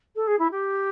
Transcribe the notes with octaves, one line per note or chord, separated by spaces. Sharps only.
A4
G#4
E4
G4